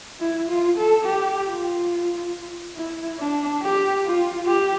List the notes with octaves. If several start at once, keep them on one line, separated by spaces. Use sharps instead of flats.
E4
F4
A4
G4
F4
E4
D4
G4
F4
G4